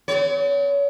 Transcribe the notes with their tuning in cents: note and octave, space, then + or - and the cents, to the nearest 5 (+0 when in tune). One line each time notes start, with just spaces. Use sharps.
C4 -45 C#5 +30